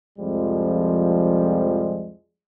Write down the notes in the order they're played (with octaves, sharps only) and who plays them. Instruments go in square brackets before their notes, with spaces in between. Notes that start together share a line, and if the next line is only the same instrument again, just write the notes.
[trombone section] C2 F2 F3 G3 G#3